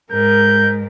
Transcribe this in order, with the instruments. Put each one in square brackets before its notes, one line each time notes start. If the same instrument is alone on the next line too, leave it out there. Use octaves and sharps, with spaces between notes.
[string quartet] G#2 [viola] A#4 [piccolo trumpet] G6